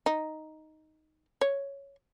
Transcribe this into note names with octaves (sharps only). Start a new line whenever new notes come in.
D#4
C#5